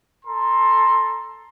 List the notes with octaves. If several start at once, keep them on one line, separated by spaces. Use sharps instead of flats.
A4 A#5 C6